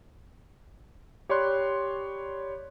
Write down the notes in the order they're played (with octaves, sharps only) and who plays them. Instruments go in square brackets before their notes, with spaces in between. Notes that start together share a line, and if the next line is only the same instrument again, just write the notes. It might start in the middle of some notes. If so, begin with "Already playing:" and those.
[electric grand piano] G4 C#5 D5 B5 C6 F#6